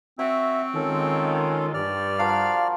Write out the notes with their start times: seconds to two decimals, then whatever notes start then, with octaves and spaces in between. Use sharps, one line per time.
0.19 C4 F#4 C#5 E5
0.75 D#3 G#3 C#4 F4 A4
1.74 G2 D5 F6
2.19 F3 F#4 A#4 F5